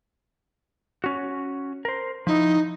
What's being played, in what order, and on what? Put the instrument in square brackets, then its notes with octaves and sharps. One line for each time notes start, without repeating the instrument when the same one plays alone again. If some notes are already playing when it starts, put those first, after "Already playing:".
[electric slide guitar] C#4 F#4
A#4 C5
[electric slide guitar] F3 E4 [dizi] D#4